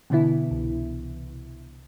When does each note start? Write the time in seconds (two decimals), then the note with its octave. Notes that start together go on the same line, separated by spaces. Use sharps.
0.10 B2 D3 E3 B3 E4
0.51 C2